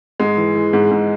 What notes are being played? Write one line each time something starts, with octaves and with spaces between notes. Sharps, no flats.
G#2 G#3
E3
E3
G#2
G#2